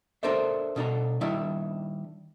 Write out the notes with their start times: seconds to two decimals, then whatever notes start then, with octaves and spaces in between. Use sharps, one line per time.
0.23 D4 A4 A#4 C5 D5 E5
0.76 B2 D4 A4 A#5
1.21 D#3 G3 D4 E4